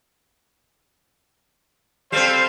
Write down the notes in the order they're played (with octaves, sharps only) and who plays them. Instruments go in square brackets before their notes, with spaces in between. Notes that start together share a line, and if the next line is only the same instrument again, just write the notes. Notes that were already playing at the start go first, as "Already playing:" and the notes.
[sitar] G3 C4 [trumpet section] A4 C5 F5